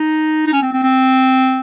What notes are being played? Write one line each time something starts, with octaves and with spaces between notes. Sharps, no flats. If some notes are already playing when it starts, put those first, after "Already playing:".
Already playing: D#4
D#4
C#4
C4
C4
C4